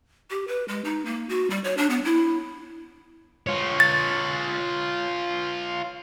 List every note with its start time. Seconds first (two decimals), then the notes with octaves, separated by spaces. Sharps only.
0.30 G4
0.47 B4
0.68 G#3
0.84 D#4
1.05 A#3
1.29 F#4
1.50 G3
1.64 C#5
1.77 D4
1.90 B3
2.05 E4
3.47 F4 C#5
3.80 A6